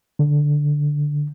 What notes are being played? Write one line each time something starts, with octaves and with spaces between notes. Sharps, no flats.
D3